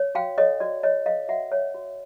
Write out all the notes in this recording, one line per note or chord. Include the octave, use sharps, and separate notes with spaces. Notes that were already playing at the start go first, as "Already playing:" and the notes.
Already playing: C#5
F#4 F5 G5
A4 C#5 D#5
F#4 D5
C#5 D#5
A4 D#5 F5
F#4 E5 F#5
C#5
F#4